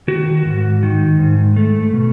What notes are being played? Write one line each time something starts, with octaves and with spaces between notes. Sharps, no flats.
D#3 F#4
G#2
D#3
G#2
A3
B2